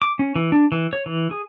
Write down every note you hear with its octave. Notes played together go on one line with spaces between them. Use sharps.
D6
C#4
E3
D4
E3
C#5
E3
G#4